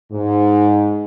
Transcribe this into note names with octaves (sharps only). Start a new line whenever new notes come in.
G#2